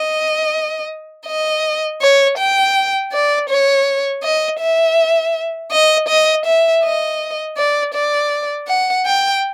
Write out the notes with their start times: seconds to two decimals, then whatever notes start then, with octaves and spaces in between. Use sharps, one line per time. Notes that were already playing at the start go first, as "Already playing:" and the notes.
Already playing: D#5
1.26 D#5
2.01 C#5
2.37 G5
3.12 D5
3.49 C#5
4.23 D#5
4.60 E5
5.71 D#5
6.08 D#5
6.45 E5
6.83 D#5
7.57 D5
7.94 D5
8.68 F#5
9.06 G5